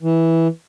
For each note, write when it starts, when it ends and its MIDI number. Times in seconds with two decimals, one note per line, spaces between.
0.03 0.48 52